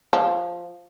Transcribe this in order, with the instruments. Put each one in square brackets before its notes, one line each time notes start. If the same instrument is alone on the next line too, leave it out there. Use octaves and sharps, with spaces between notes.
[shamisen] F3